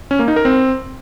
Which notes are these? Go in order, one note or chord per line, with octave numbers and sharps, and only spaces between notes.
C#4
A#3
D#4
A#4
C4